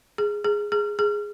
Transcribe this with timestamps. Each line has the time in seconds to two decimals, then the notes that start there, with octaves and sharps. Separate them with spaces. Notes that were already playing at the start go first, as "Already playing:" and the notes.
0.18 G#4
0.45 G#4
0.72 G#4
0.99 G#4